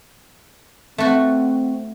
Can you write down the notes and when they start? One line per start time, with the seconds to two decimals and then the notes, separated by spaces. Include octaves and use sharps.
0.98 A3 C4 F#4